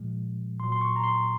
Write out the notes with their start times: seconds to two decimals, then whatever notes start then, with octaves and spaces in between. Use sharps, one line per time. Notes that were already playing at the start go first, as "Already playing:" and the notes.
Already playing: A#2 F3 G#3
0.60 A#2 C6
0.64 F#3
0.72 C6
0.81 C#6
0.96 A#5
1.04 C6